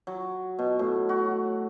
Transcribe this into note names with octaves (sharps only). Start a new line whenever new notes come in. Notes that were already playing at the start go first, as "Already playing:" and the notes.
F#3
B2
A2
F#4